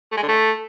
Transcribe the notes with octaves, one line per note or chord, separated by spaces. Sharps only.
A3
G#3
D3
A3